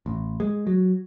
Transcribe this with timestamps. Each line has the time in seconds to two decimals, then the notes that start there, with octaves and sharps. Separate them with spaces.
0.06 A1
0.40 G#3
0.67 F#3